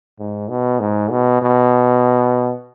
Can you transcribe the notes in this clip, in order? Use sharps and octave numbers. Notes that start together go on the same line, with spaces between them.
G#2
B2
G#2
B2
B2